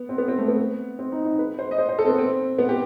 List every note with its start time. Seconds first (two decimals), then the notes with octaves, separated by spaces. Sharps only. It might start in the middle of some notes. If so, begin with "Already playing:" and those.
Already playing: B3
0.09 C4
0.18 B3
0.28 C4
0.38 A3
0.48 B3
0.99 C4
1.12 D#4
1.25 D#4
1.39 B4
1.59 C5
1.71 D#5
1.78 C5
1.89 C5
1.99 A4
2.04 C4
2.09 B3
2.18 C4
2.59 B3
2.69 G4